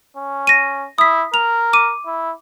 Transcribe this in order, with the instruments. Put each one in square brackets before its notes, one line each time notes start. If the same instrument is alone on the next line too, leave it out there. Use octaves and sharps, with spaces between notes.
[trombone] C#4
[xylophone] A#6 D#7
[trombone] E4 [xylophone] D#6 B6
[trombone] A#4 [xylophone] F7
[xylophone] D6 D#7
[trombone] E4